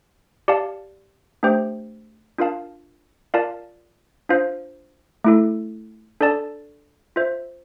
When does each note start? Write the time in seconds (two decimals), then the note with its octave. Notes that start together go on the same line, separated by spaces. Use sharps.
0.48 G4 D5 F5 A5
1.43 A3 D4 G4 C5 G5
2.38 D4 F4 A#4 F5 A5
3.34 F4 A#4 D5 F5 A5
4.29 D4 F4 C5 F5
5.24 A3 E4 A4
6.21 D4 A4 D5 A5
7.16 F4 C5 E5